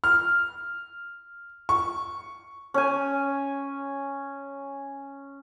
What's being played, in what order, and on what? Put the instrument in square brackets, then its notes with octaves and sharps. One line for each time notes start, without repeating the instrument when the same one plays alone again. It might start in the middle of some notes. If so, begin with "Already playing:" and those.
[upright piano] F6
C#6
[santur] C#4 G#5